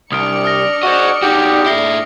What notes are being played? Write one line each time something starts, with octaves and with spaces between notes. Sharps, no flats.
C2 D4 D5 D#6 F6 C#7 D7
D#6 F6 A#6
F#4 C5 D#5
D#4 F#4 G4
G#2 E4 A#6 C7 G7